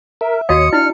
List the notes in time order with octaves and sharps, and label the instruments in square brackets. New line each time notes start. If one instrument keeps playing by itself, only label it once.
[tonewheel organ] A#4 [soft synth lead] E5
[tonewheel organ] D#2 C#5 [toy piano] F#4 D#5 F5 [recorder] D#6 [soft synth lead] C#7
[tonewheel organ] D4 [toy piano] E4 [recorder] F6